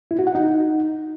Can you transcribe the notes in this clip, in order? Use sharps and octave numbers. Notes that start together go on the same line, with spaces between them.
E4
F#4
F#5
D#4